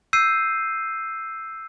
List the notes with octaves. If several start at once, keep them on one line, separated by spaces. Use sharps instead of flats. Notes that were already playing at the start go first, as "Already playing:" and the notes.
E6 G6 C7 D#7